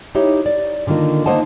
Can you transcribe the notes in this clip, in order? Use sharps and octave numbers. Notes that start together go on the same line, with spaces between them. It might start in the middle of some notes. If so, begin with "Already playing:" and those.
D#4 E4 G4 C#5 E5
D5
D3 D#3 A#3 F4 A#4
A#3 D#4 C5 D#5 F#5 A5